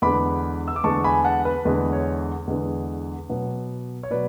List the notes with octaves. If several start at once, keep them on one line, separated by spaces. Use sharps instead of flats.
E2 D3 G#3 B3 B5 D6
E6
D6
E2 D3 G#3 B3 A5 C#6
G#5 B5
F#5 A5
B4
E2 D3 G#3 B3 B4
C#5
E2 D3 G#3 B3
B2 F#3 B3
C#5
B2 F#3 B4 D5